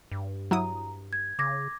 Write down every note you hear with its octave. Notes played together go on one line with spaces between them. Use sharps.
G2
F#3 E4 A#5 D#6
G#6
C#3 D6 G#6 A#6